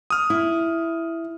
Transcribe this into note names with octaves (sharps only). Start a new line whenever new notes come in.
D#6 F6
E4